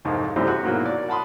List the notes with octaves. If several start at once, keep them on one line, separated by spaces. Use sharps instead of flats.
C2 F2 G#2 D#4
F#2 C3 E3 G3 A3 C4
F#4
G#2 B2 F#3 A#3 E4
F#4 D5
F#5 A5 B5 C6 D#6